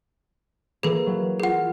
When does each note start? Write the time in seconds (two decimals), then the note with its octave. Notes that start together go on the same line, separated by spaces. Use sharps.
0.83 E3 A#3 G#4 A4
1.06 F#3
1.40 F4 G#4 F#5 C7